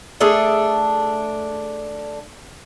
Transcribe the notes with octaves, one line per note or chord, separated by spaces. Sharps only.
A3 D4 G#4 A4